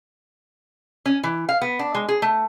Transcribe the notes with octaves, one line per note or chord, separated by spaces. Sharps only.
C#4
E3
F5
B3
D4
G#3
G#4
A3